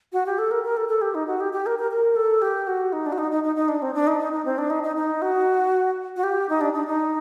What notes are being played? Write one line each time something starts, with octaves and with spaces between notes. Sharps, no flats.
F#4
G4
A4
A#4
A#4
A4
A4
G4
D#4
F#4
G4
G4
A#4
A#4
A#4
A4
G4
F#4
D#4
D4
F#4
D#4
D#4
D#4
D#4
D4
C4
D4
D#4
D#4
D#4
C4
D4
D#4
D#4
D#4
F#4
F#4
G4
D#4
D4
D4
D#4